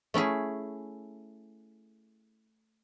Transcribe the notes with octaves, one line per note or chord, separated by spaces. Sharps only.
A3 C#4 E4 G#4